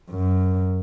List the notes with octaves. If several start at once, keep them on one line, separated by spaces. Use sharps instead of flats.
F#2